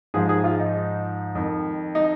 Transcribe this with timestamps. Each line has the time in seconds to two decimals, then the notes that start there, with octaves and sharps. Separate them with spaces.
0.14 G#2 F3 G#4
0.29 G#4
0.44 F4
0.59 D#4
1.35 F2 D#3
1.95 D#4